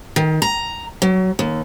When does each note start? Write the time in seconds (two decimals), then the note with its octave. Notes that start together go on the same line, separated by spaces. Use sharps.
0.16 D#3
0.42 A#5
1.02 F#3
1.39 D#2